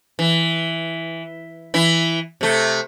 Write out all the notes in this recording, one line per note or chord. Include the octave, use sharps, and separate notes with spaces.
E3
E3 E4
C3 A3